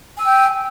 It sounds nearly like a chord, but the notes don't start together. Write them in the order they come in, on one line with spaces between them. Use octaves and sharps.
G#5 E6 G5